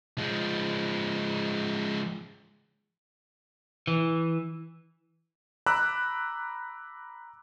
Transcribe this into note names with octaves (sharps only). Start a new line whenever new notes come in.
F3 G#3
E3
A#5 B5 D6 E6 F#6